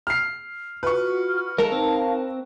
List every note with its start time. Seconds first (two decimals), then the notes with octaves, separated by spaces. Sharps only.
0.07 F6 C7
0.83 F4 F#4 B4 C#6 F6
1.58 G#3 D#4 A4 A#4 F5 A5
1.72 C4